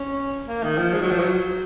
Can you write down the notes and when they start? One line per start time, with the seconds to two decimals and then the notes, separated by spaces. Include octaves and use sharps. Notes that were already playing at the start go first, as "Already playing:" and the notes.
Already playing: C#4
0.48 A#3
0.63 D#3
0.78 F3
0.94 G#3
1.01 F#3
1.11 F3
1.19 F#3